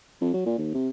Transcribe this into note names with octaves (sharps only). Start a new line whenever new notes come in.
F2
F#3
A#2
D#2
C3